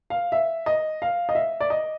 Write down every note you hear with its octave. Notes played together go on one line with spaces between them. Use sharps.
F5
E5
D#5
F5
D#5
E5
D5
D#5